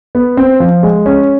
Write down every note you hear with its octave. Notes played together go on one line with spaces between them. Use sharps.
B3
C4
F3
G#3
C#4